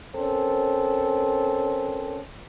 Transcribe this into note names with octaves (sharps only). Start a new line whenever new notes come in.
C4 C#4 A4 A#4 C5